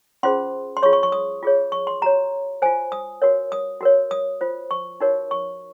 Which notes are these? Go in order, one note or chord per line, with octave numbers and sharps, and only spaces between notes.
C#4 F4 G#4 C5 C6
C6
F4 G#4 C#5 C#6
C#6
C#6
D#6
F4 G#4 C#5
C#6
C6
F#4 C#5 A#5
F4 C5 G#5
D#6
F#4 A#4 C#5
D#6
F#4 A#4 C#5
D#6
F4 C5
C#6
D#4 F#4 A#4 C#5
C#6